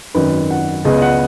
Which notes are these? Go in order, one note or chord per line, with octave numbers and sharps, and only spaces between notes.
G#1 F#2 D#3 B4
F#5
C#2 C#3 G#3 B3 D#5
D#5
F#5